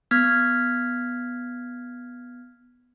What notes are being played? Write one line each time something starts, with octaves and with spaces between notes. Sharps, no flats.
B3 F6 G#6 B6